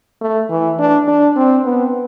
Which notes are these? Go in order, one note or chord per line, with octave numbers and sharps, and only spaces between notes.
A3
E3
D4
D4
C4
B3